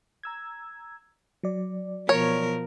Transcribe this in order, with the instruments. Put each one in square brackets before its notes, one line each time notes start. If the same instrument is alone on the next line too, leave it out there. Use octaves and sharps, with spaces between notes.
[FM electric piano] A#5 E6 G#6
F#3 D5
[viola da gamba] B2 F3 A#4 [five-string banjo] C#5